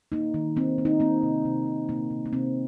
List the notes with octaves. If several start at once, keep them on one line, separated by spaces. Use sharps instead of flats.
A#3 D#4
D#3
A#3 C4
A#3
D#4
A#3 C4
C3
C3
C3
C3 A#3
C3
A#3
C3 C4